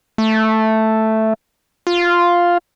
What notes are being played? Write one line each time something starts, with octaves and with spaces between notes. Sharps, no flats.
A3
F4